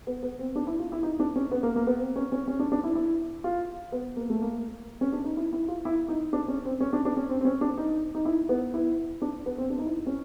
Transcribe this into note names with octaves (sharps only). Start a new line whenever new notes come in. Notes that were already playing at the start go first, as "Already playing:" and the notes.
B3
B3
C4
D4
E4
F4
E4
D#4
D4
C#4
B3
A#3
A#3
B3
C4
C#4
C#4
C#4
D4
D4
E4
E4
F4
B3
A#3
A3
A#3
C#4
D4
D#4
E4
E4
F4
E4
D#4
D4
C#4
C4
C#4
D4
D4
C#4
C4
C4
C#4
D4
D#4
D#4
E4
B3
E4
D4
B3
C4
D4
D#4
E4
C#4